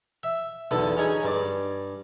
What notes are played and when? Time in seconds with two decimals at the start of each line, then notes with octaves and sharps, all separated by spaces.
0.23 E5
0.71 B1 E2 D3 B3 A4 D#6
0.97 C#4 D#4 G#4 C#5
1.23 G2 D5